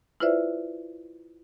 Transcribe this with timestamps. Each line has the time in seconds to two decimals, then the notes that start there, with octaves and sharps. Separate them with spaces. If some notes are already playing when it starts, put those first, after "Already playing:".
0.20 E4 F4 B4 C5 D5 E5